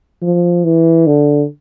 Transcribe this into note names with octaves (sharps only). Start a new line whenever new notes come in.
F3
E3
D3